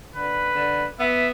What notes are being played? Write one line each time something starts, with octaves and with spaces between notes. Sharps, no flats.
D3 B4
D3
B3 E5